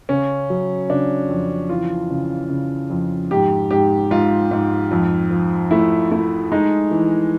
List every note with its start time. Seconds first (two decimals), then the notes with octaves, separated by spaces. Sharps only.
0.09 C#3 C#4
0.50 F#3
0.89 C#3 D4
1.29 F2
1.69 E3 F4
2.11 C#3
2.50 C#3
2.90 F2
3.31 G#2 G4
3.71 G#2 G4
4.11 G#2 F4
4.51 G#2
4.91 F2
5.31 F3
5.71 A3 E4
6.11 A3 E4
6.52 G#3 D#4
6.91 E3